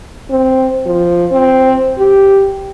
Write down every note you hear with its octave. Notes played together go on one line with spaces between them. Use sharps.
C4
F3
C4
G4